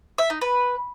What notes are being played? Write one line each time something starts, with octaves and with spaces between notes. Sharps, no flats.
E5
D#4
B4